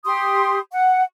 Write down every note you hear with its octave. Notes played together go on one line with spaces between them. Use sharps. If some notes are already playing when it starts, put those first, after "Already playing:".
G4 C6 D#6
F#5